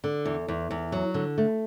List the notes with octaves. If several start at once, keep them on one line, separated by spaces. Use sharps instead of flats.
D3
E2
E2
E2
F#3
D3
A3